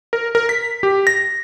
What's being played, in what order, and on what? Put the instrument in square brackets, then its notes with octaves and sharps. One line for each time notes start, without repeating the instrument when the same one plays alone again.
[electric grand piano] A#4
A#4
B6
G4
A#6